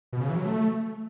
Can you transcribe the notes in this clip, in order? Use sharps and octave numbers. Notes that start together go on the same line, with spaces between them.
B2
C#3
E3
F#3
A3